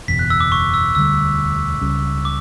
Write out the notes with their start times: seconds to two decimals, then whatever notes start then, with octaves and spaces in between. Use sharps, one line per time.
0.08 F#1 E2 B2 B6
0.19 F#6
0.30 E6
0.40 D6
0.52 C#6
0.74 E6
0.95 E1 D2 D3 G3 E6
1.81 C#2 C#3 G3 C#4
2.25 D6